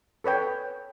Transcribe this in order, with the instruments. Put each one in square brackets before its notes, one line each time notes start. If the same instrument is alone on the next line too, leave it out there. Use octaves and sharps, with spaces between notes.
[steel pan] A4 B4 C#5 G5